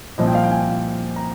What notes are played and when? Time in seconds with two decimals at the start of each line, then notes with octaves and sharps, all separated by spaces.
0.18 C2 A#2 F3 D#5
0.27 G5
0.35 F5
0.44 G5
0.51 G#5
1.16 A#5